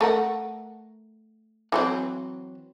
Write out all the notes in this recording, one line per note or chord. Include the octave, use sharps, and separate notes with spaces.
A3 A#4 F#5
E3 F#3 C4